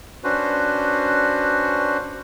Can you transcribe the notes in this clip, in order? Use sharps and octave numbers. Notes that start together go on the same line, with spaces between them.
C#4 D4 F#4 B4 C5